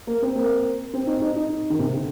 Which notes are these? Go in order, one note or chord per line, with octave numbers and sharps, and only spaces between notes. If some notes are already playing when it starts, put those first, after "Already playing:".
A#3
C4
A#3
C4
D#4
D#4
D#4
D#3
C3
D3